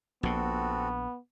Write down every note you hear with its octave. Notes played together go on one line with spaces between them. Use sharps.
A#1 A#2 B3 C4 F#4 A4